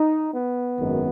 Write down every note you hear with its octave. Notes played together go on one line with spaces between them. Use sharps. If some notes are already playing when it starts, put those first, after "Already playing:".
Already playing: D#4
B3
G#1 F#2 D#3